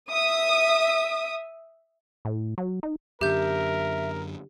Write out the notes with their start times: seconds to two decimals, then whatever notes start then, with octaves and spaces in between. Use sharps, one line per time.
0.11 E5 D#6
2.25 A2
2.58 F#3
2.83 D#4
3.21 F#2 D3 G4 A#4 E5 G6